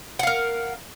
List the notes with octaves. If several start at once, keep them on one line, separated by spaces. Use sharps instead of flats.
A#4 F5 F#5